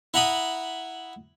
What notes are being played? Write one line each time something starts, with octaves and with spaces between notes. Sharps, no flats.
E4 F#5 A#5 B5 D#6